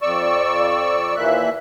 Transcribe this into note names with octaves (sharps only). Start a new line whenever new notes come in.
F2 D5 C#6 E6
D#2 A#2 E3 A#3 E5 F#6